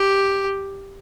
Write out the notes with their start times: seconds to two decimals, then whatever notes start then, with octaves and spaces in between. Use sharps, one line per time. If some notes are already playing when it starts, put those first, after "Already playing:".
Already playing: G4